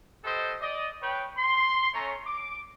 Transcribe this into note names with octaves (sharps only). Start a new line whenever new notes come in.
G4 A4 B4 C5 D#5
D5 D#5
B4 C#5 G5
C6
A3 C#4 C#5 A#5
D6